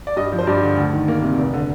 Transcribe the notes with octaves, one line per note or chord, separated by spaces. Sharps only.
D5
G2 D#5
F3
C5
G2 D5
D3
D2
D#3
A#3
C3
F1
D3